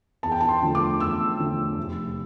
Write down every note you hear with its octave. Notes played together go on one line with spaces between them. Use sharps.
E2 A5
G5
A5
C6
D3 F3 A3
D6
E2 E6
D3 F3 A3
F1